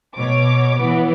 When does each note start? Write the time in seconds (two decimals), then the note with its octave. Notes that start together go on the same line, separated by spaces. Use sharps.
0.15 B2 C#5 D6
0.78 E3 B3